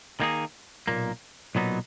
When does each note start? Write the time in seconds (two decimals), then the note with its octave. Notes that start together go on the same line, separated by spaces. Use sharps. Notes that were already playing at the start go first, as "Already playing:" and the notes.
0.20 D#3 A#3 D#4 G#4
0.88 B1 A#2 A#3
1.55 B1 A#2 F#3 B3 D#4